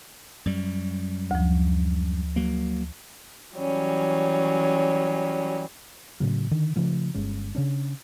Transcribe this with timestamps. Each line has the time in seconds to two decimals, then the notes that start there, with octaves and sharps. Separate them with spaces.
0.46 F#2 G3
1.31 D2 F3
2.36 F#3 A#3
3.56 E3 F#3 G3 C#4
6.20 A2 C#3 F#3
6.51 D3 D#3
6.76 C#3 F3 A3
7.15 G1 G#3 C#4
7.55 C#3 C#4 D4